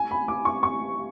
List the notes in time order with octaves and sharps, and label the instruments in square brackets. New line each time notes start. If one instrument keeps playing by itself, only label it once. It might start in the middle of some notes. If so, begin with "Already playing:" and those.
Already playing: [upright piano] G#5
B5
D6
C#6
C#6